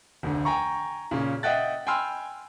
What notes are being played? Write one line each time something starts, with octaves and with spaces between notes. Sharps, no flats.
F1 D2 D3
G5 G#5 A#5 C#6
A#2 C#3 C#4
D#5 E5 F#5 G5 F#6 A6
G5 G#5 B5 C6 E6 F6